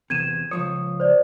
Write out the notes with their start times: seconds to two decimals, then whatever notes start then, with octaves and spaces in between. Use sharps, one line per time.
0.10 E2 C3 G#6 D#7 E7
0.51 C#2 F3 C#5 D#6
1.00 C5 D5